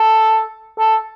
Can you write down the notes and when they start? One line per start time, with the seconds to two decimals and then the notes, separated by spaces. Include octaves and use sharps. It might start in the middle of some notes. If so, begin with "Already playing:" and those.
Already playing: A4
0.79 A4